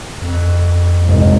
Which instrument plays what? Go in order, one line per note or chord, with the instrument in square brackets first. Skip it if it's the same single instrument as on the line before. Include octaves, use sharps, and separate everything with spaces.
[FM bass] F2
[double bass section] F#1 C2 G#2